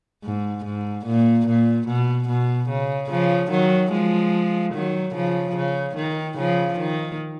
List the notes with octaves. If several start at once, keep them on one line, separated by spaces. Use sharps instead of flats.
G#2
G#2
A#2
A#2
B2
B2
C#3
C#3 F3
D#3 F#3
F3 G#3
D#3 F#3
C#3 F3
C#3
D#3
C#3 F3
D#3